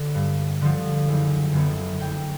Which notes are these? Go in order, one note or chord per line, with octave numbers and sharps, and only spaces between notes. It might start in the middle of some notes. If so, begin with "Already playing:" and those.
Already playing: D3
G2
D3 F3
F#1
F#2 D3 F#3 B3
F#1 G5